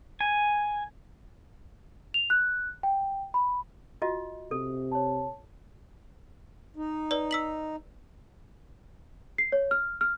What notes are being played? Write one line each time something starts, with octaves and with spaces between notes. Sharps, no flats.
G#5
F7
F#6
G5
B5
F4 F#4 D#5
C3 A4
C#5 A5
D#4
B4 D5
E6 B6 F#7
C7
C#5
F6
F6